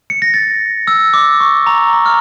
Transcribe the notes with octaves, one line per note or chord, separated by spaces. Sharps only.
C#7
A#6
A6
E6
D6
C#6
A#5
A#5
F6